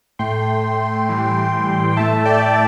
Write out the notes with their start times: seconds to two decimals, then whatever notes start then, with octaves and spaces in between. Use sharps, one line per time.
0.19 A2 A3 G5 C6
1.07 A2 E3 G3
1.91 G5
1.97 A2 A3 E5 A5
2.25 D5 G5